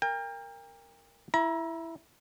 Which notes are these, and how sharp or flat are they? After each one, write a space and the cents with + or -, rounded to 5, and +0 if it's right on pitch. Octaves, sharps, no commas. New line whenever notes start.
A#4 -10 G5 +35
E4 +5 A#5 +35